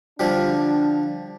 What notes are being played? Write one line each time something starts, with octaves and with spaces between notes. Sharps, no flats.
D3 F3 G3 D4